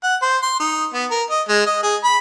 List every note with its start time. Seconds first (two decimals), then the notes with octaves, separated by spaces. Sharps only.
0.03 F#5
0.22 C5
0.42 C6
0.60 D#4
0.93 B3
1.11 A#4
1.30 D#5
1.48 G#3
1.66 D#5
1.83 G#4
2.04 B5